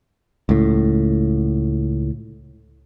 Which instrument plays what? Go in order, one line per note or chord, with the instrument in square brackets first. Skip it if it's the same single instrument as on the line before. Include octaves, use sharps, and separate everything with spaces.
[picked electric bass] C#2 A2